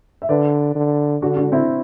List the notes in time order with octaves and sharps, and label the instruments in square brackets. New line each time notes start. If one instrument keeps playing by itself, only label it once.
[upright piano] E5
[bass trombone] D3 [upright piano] B4 D5
[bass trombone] D3
[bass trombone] D3 [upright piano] D4 F#4
[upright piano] D4 F#4
C4 E4